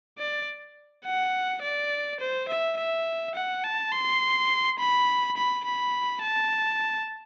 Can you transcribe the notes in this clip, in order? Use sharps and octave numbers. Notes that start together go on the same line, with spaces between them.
D5
F#5
D5
C5
E5
E5
F#5
A5
C6
B5
B5
B5
A5